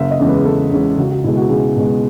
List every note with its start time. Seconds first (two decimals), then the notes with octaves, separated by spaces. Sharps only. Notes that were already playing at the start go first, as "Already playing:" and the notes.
Already playing: F#1 E5
0.11 D#5
0.19 E2 C#3 G#3 C#4
0.28 B4
0.45 F#1 A4
0.71 E2 C#3 G#3 C#4
0.98 C#2 F#4
1.11 F#4
1.24 B2 G#3 E4
1.37 F#4
1.50 C#2 G#4
1.76 B2 G#3